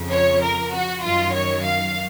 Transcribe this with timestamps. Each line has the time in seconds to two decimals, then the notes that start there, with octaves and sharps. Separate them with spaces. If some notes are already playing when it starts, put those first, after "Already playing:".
Already playing: F2 C#3 F3
0.12 C#5
0.42 A#4
0.73 F#4
1.03 F#2 D#3 F#3 F4
1.34 C#5
1.65 F5